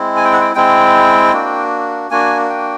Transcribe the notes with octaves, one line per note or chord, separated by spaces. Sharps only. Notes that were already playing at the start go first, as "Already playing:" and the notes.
Already playing: G#3 C4 E4
G#5
G5
F#5
G5
G#3 C4 E4 G5
A#3 D4 F#4
A#3 D4 F#4 G#5
G5